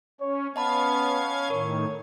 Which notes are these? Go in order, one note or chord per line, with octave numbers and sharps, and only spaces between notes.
C#4 C#5
B3 C#4 D#5 F5 A5 B5 G#6
A2 D#3 A#4 C#5